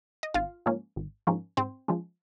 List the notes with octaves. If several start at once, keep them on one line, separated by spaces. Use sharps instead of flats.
D#5
G#1 F4 F5
G#2 F3 A#3 C#4
G#1
G#2 F3 A#3 C#4
G#2 C4 C5
F3 G#3 C#4